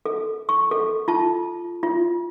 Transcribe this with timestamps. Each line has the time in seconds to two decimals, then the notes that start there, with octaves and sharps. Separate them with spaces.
0.06 A4
0.49 C#6
0.71 A4
1.08 F4 A5
1.83 F4